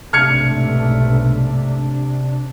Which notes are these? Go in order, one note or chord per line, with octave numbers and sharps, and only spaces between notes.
B1 G#2 C3 A3 D4 F6 G#6 C#7